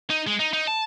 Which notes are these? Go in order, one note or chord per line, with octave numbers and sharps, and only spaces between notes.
D#4
G#3
D#4
D#4
A5